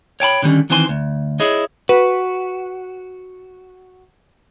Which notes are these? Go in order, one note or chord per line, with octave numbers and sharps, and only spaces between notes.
C#5 G5 A5 B5
D3 D#3 G3 A3 C#4
D#3 E3 C4 C5 G#5 C6
D2
E4 G#4 C#5 D#5
F#4 B4